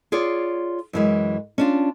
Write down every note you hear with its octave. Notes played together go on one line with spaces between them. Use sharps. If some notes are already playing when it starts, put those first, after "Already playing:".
F4 G#4 C#5 D5
F#2 E3 G#3
C#4 D4 F4